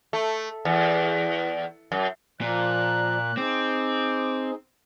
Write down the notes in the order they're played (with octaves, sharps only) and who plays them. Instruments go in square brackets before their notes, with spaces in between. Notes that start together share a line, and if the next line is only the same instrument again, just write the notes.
[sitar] A3
E2
F#2
[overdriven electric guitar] A#2 [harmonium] F3 D5 [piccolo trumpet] F#6
[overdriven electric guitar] C4 [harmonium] D#4 G#4 [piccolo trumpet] D6